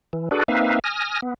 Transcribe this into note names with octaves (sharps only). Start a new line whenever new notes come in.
E3
D4 F#4 G#4 A4 B4 D5
A#3 C4 D#4 B4 E5 F5
G#5 D#6 F6 A#6
B3